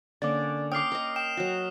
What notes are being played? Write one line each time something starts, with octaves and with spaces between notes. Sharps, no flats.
D3 A#3 C#4 D5 D6
C#5 F5 G5 D6 D#6 F6 C7
A#4 C#5 D#5
G5 E7
F#3 F#4